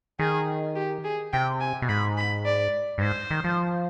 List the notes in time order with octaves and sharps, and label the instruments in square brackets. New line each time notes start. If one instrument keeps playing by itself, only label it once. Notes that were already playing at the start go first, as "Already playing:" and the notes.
[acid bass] D#3 [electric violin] G#4
[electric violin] G4
G#4
[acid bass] C3 [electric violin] G5
[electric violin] G#5
[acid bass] B2
[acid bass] G#2 [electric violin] B5
[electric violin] B5
D5
[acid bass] G2
[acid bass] G#2 [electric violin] C5
[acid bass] D#3
F3